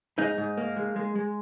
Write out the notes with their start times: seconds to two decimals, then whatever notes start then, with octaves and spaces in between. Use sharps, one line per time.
0.18 G#2 D#4
0.38 G#2
0.58 A#3
0.77 G#3
0.96 G#3
1.16 G#3